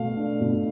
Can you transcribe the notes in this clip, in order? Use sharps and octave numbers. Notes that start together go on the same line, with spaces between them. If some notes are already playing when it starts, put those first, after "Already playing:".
Already playing: B2 A3 F5
D4
B2